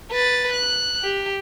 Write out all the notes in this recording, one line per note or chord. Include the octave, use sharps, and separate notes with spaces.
B4 A6
F#6
G4